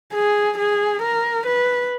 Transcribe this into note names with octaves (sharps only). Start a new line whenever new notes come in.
G#4
G#4
A#4
B4